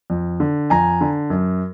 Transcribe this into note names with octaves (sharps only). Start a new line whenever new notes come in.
F2
D3
F2 G#5 A#5
D3
F#2